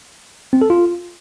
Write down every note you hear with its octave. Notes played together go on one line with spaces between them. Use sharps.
C4
A4
F4